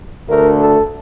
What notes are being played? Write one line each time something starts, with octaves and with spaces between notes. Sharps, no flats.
D2 D3 A3 A#4
A4